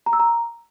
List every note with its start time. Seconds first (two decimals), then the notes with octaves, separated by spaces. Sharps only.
0.06 A#5
0.13 E6
0.20 A#5